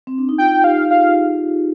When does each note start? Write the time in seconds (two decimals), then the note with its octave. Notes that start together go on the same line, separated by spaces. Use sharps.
0.07 C4
0.18 D4
0.29 D#4
0.38 F4 G5
0.64 D#4 G4 F5
0.90 F4 G#4 F5